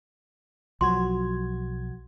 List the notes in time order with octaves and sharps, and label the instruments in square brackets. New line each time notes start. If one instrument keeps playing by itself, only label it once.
[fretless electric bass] B1 F#3 [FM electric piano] F3 F#4 G#6 [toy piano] C6